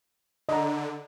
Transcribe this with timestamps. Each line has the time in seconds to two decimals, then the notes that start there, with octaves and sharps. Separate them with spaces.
0.49 D3 D#5 A#5